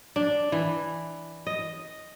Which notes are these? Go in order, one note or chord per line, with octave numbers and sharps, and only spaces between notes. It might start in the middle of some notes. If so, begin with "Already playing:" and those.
D4
E3
D#5